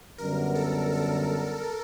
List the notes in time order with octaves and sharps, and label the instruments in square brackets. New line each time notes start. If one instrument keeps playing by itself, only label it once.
[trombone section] F#2 D3 G3 B3 [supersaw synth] A#4
[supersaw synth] A4
A4